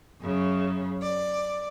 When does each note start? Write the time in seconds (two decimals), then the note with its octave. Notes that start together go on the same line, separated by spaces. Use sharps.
0.22 F#2 C#3
1.01 D5